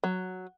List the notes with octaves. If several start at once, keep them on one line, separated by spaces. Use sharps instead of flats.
F#3